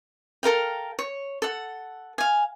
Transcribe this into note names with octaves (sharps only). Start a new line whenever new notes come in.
A4 A#4 F5 G5
C#5
A4 F#5
F5 G#5